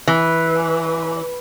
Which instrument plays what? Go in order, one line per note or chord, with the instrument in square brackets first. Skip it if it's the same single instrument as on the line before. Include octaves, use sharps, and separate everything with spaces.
[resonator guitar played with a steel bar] E3